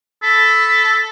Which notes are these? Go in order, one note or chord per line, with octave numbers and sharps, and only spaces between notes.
A4 B5